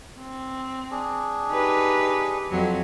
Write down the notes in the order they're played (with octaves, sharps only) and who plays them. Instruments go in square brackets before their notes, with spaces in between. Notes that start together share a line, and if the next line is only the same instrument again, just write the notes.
[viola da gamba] C4
[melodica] D4 G#4
[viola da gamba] D#4 G4 B4
F2 F#3